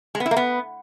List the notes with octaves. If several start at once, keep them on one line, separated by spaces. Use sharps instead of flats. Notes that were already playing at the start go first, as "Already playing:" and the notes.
G#3
B3
E4
A#3
B3